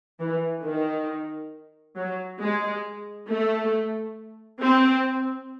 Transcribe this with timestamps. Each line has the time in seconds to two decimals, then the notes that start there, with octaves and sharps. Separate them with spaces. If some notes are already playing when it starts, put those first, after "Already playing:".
0.19 E3
0.64 D#3
1.96 F#3
2.41 G#3
3.29 A3
4.62 C4